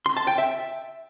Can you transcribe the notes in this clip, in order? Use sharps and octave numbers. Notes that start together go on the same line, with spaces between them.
C6
A5
G5
E5